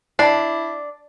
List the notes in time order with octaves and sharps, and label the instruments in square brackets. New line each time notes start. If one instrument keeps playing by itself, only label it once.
[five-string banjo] D4 [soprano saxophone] E4 [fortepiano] D5 [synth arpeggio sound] A5 C7